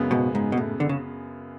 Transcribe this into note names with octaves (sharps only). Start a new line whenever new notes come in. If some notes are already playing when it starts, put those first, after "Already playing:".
Already playing: F#2 C#3 G#3 B3
G#2 B2
G#2
B2
A2
D3
C#3